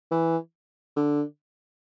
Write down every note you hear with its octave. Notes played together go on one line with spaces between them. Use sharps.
E3
D3